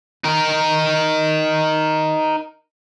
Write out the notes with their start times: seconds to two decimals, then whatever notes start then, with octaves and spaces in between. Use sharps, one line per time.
0.24 D#4 A#4